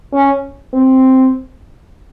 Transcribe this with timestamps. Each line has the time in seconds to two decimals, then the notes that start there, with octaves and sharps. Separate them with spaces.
0.13 C#4
0.73 C4